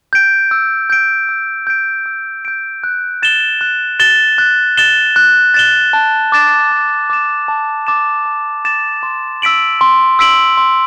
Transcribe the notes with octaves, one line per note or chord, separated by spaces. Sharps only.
G6 D7
E6
G6 D7
E6
G6 D7
E6
G6 D7
F#6
A6 E7 G7
F#6
A6 E7 G7
F#6
A6 E7 G7
F#6
A6 E7 G7
A5
D6 A6 E7
A5
D6 A6 E7
A5
D6 A6 E7
A5
D6 A6 E7
C6
E6 B6 D7 F#7
C6
E6 B6 D7 F#7
C6